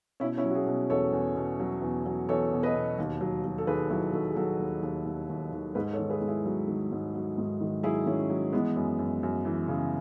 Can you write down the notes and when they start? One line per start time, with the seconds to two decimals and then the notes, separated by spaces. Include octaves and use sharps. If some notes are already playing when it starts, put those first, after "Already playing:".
0.20 B2 C#4 E4
0.38 C#4 E4
0.44 F#3
0.50 F#4
0.55 E4 G#4
0.66 B2
0.90 E2 A4 C#5
1.12 E2
1.36 B2
1.59 F#3
1.82 E2
2.06 F#3
2.29 E2 A4 C#5
2.52 B2
2.63 B4 D#5
2.75 B2
2.99 D#2
3.21 F#3
3.44 F#3
3.58 A4
3.67 D#2 G#4 B4
3.90 F#3 E4 G#4
4.13 D#2 F#4 A4
4.30 G#4
4.36 F#3 F#4 A4
4.59 D#2
4.82 D#2
5.06 D#2
5.29 D#2
5.52 D#2
5.75 G#2 G#4 B4
5.93 A4 C#5
5.99 D#3
6.10 G#4 B4
6.21 G#2
6.28 E4 G#4
6.45 F#3
6.68 D#3
6.91 G#2
7.15 F#3
7.38 G#2
7.61 D#3
7.83 F#3 E4 G#4
8.06 D#3 C#4 E4
8.30 F#3
8.53 E3 G#3 B3
8.76 F#2
8.99 F#2
9.23 F#2
9.45 E3
9.68 C#3